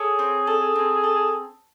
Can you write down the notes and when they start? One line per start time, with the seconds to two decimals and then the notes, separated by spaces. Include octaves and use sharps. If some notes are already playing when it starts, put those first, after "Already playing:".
Already playing: G#4 A4 C#5
0.19 C4
0.47 A4
0.76 C4
1.04 A4